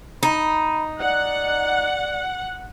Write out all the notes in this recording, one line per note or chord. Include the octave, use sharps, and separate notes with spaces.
D#4 B5
D5 F#5